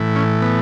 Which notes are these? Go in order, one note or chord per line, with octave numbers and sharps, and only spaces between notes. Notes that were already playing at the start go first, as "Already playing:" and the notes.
Already playing: A2 E3
C#4
B3